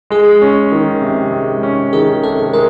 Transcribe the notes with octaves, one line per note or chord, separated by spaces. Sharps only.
G#3 G#4
C#4
D#3
C3
G#3
C#4
D#3 G#4
C3 A4
G#3 A#4